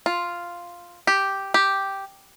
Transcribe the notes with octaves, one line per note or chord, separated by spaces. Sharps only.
F4
G4
G4